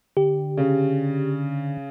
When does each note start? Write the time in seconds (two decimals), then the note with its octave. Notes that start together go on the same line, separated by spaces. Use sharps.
0.17 D3 G4
0.57 C#3